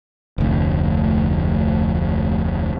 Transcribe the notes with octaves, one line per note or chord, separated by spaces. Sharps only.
F1 D2